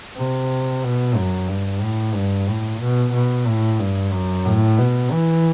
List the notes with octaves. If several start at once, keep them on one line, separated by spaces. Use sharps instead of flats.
C3
B2
F#2
G2
A2
G2
A2
B2
B2
A2
G2
F#2
A2
B2
E3